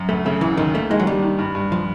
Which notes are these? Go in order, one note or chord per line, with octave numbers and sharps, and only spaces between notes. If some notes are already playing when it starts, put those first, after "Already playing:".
Already playing: F#2
D2 A3
C#3 A3
D2 E3
D2 D#3
A3 A#3
D#3 G#3
F#3
G3 D4
D#3
G2
G2
F3